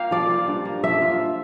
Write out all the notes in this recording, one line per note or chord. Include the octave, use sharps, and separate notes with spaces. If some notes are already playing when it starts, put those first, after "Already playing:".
Already playing: A#3 F4 F5 G5
F3 D5
F4
G2
A#3
F3 E5
F4